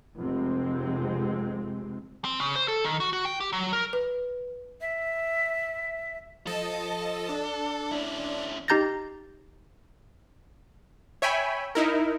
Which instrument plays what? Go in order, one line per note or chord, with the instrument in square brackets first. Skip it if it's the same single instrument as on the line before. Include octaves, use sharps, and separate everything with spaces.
[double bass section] F1 C3 G#3 C4
[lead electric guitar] C4
C#3
C5
A4
D#3
F#4
F#4
G5
G4
F#3
A#4
[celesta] B4
[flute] E5
[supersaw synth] F3 D#5 A5 [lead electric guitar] A4
[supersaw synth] D4
[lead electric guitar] C#4 E4
[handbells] D#4 G4 A#5 G6 A6 A#6
[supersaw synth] C#5 E5 G5 G#5 B5
D#4 E4 A#4